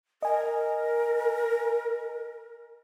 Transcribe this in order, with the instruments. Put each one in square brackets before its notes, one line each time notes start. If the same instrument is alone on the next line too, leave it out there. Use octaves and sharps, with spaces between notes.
[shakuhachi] A#4 [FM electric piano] D#5 G#5